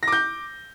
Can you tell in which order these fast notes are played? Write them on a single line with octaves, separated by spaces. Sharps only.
A#6 D6 G6